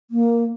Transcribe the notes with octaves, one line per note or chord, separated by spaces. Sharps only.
A#3